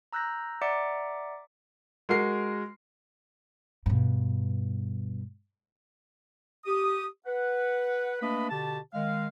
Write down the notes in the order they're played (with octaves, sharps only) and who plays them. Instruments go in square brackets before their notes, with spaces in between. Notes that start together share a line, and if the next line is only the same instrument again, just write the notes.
[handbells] A#5 E6 F#6 G6 A#6
D5 E5 F#5 A#5 D6 C#7
[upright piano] G#3 F#4 A#4 C7
[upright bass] G2 B2
[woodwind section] G4 D#6
B4 F#5
A3 A#3 D4 B4 D#5 B5
B2 D3 G4 A5
D#3 G#3 F5